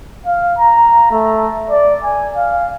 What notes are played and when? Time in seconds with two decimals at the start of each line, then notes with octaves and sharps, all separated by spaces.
0.26 F5
0.59 A#5
1.11 A3
1.70 D5
2.04 G#5
2.36 F5